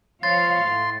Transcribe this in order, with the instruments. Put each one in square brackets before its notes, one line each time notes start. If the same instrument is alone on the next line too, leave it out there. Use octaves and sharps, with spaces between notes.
[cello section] F3 C#5 F5 [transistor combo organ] C6 [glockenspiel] A6
[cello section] A2